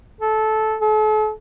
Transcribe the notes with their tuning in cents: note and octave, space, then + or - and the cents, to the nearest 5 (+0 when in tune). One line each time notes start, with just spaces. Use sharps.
A4 -15
A4 -40